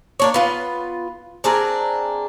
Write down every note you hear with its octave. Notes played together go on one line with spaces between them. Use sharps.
A#3 D4 C#5
B3 F4 B4
C4 D4 G#4 A#4